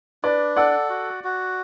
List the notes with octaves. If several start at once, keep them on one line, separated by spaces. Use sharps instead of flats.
D4 B4 D5
A4 D5 F#5
F#4
F#4